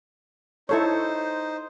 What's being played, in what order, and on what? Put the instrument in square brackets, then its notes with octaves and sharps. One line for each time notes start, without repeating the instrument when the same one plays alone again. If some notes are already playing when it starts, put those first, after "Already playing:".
[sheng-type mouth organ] D#4 C5 [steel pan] E4 A4 C#5